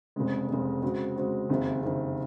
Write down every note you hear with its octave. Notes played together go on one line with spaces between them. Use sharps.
F1 F2 C#3 G#3
F1 F2 C#3 G#3
C#3 G#3 C4 F#4
C#3 G#3 C4 F#4
F#1 F2 C3 D#3
F#1 F2 C3 D#3